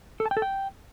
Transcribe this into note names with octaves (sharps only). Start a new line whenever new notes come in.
A4
A5
G5
A4
G5